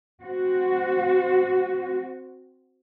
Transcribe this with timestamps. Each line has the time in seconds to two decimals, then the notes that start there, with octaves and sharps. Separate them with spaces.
0.23 C4 F#4